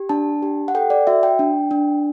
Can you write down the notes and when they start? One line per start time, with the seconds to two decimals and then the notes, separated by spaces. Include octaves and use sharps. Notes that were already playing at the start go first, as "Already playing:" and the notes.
Already playing: G4
0.09 D4 A5
0.42 G4
0.68 F#5
0.75 A4 G5
0.90 D5
1.07 F#4 E5
1.23 G5
1.39 D4
1.71 D4